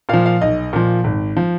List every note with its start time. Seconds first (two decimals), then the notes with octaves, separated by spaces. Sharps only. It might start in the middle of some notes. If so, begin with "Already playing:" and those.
0.09 A#2 F3 F5
0.26 F5
0.41 B1 D#5
0.73 A#2 F3
1.04 G#1
1.37 F3